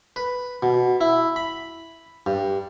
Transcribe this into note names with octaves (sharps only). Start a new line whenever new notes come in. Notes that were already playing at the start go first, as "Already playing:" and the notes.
B4
B2
E4
B5
G2